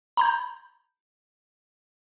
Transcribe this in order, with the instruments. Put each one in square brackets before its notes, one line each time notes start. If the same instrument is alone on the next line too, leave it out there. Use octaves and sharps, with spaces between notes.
[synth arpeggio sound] A#5 B5 G6